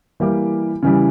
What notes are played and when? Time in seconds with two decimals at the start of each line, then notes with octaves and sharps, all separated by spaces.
0.20 E3 G3 A#3 E4 G4
0.82 C#3 E3 G3